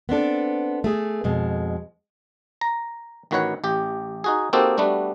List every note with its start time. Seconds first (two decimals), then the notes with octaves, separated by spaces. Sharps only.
0.09 B3 C4 D4 A4
0.84 A3 G#4
1.24 F2 B2 G#3
2.61 A#5
3.31 A1 D#3 F#4 B4 C#5 F#5
3.64 A1 G4
4.24 D#4 F#4 G#4
4.53 A#3 C4 D#4 F#4 G4 A4
4.77 G3 A3 B3 D4 F#4